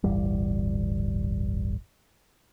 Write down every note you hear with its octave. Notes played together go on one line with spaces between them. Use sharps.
D1 G1 E3 G3